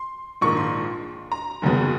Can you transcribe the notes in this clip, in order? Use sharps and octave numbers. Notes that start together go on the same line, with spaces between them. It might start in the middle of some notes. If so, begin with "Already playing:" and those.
Already playing: C6
A#1 G#2 D#3 C#6
C6
A#5
F1 D#2 C#3 F#3 B3